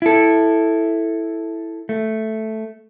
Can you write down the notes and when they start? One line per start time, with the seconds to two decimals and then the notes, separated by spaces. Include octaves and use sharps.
0.02 E4 A4
1.89 A3